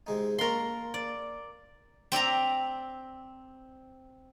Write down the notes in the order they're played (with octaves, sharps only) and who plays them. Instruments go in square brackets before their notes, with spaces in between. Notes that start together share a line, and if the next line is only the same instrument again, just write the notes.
[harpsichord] C3 G#3 D#4
[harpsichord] A#3 A5 C#6 [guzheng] A#4 C6
[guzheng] D5
C4 D5 E5 A#5